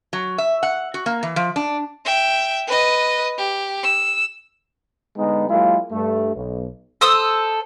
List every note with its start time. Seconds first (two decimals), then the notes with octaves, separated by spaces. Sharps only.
0.13 F#3
0.38 E5
0.63 F#5
0.94 F#4
1.06 A#3
1.23 E3
1.36 F3
1.56 D4
2.05 E5 G5
2.67 B4 D#5
3.38 G4
3.83 E6
5.17 D3 G#3 B3 D#4
5.49 F#3 G#3 A#3 E4 F4
5.90 G2 A3
6.35 B1
7.01 A4 C5 D#6 E6